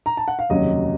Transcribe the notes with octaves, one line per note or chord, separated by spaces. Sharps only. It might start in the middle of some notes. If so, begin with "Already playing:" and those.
A#5
A5
F#5
F5
F1 D#2 C#3 F#3 D#5